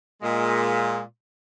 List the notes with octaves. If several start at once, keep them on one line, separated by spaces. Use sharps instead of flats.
A#2 G#3